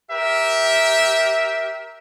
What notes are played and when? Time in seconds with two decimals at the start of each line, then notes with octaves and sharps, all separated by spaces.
0.11 G4 A#4 E5